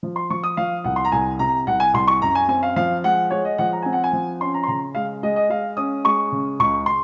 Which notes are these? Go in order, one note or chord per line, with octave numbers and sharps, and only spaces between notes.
F3
C6
F3 C#6
D#6
F3 F5
C2 F#5
C6
A#5
C2 G#5
C3 A#5
C2 F#5
G#5
C2 C6
C#6
F#2 A#5
G#5
C4 G#5
F5
F3 F5
G#3 F#5
G#3 C#5
D#5
F3 F#5
A#5
C4 G#5
F#5
G#5
F3
C#4 C6
A#5
C6
C#3 A#5
G#3 F5
G#3 D#5
D#5
G#3 F5
C#4 D#6
G#3 C#6
C#3
C#2 C#6
C6